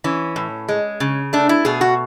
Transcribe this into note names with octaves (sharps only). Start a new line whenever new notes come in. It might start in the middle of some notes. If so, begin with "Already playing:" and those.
E3 C#4
A2
G#3
C#3
A3 D4
E4
B2 G#4
F#4